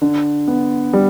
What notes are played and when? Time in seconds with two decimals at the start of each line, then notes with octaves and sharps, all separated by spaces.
0.02 D3
0.48 B3
0.93 G3